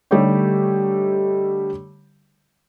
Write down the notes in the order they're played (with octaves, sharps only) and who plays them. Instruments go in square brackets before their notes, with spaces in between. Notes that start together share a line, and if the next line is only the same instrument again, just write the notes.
[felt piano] D3 G3 A3 D#4 G4 C#5